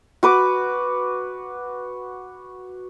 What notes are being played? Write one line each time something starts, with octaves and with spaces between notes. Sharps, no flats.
F#4 B4 D6